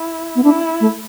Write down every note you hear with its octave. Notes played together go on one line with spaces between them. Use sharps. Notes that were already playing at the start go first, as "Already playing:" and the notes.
Already playing: E4
B3
D4 E4
A3